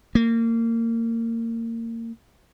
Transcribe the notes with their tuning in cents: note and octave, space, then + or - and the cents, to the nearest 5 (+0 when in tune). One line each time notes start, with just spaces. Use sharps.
A#3 -30